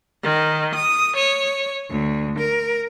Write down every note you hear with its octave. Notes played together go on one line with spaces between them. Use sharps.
D#3
D#6
C#5
D2
A#4